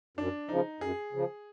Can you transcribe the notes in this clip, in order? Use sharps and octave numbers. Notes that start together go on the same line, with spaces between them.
F#2 D4
C#3 F3 D#4
F#2 G#4
C#3 F3